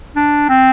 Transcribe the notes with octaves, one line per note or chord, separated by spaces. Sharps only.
D4
C4